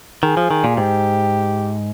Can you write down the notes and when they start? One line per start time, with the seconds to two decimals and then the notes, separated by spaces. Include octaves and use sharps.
0.23 D#3 G#4
0.37 F3
0.51 D#3
0.64 A#2
0.77 G#2 G4